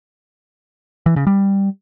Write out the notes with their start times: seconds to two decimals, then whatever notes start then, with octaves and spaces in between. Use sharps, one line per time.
1.06 E3
1.16 C#3
1.27 G3